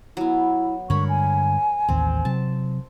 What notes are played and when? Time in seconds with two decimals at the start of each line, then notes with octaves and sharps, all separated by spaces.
0.17 F#3 B3 E4
0.90 G2 D3 G#3 A#4 C#5 B5 C#6
1.09 G#5
1.89 A1 D#2 C4
2.25 C3 F#3 A5